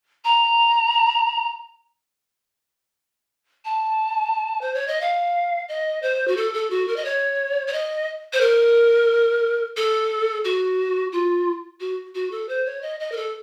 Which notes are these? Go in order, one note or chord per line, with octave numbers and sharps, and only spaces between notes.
A#5
A5
C5
C#5
D#5
F5
D#5
C5
F#4
A4
A4
F#4
A#4
D#5
C#5
C#5
D#5
C5
A#4
A4
F#4
F4
F#4
F#4
A4
C5
C#5
D#5
D#5
A#4
A4